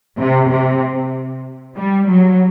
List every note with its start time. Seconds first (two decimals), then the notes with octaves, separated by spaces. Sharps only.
0.20 C3
0.52 C3
1.77 G3
2.09 F#3